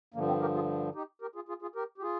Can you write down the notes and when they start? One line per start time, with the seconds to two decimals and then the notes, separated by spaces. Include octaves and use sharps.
0.14 G2 D3 F3 A#3
0.28 C4
0.41 G4 A#4
0.54 F4 G#4
0.95 D#4 G4
1.22 G4 A#4
1.35 F4 G#4
1.49 F4 G#4
1.62 F4 G#4
1.75 G4 A#4
1.98 G4
2.02 F4 G#4